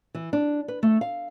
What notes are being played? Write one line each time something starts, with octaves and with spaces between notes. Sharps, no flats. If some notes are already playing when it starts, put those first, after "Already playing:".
E3
D4
B4
A3
F5